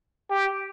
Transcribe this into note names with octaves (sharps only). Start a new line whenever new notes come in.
G4